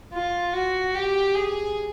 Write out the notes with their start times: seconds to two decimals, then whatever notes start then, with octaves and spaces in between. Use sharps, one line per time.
0.12 F4
0.53 F#4
0.94 G4
1.35 G#4